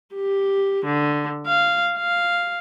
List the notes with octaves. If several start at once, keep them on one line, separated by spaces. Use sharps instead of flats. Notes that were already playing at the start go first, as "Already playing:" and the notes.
G4
D3
F5
F5